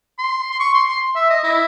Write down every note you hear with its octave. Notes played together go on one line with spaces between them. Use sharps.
C6
C6
C#6
C6
C6
E5
D#5
E4